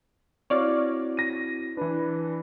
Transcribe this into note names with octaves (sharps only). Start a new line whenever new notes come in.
C4 E4 F#4 C#5 D5 F5
A#6 D#7
E3 D4 B4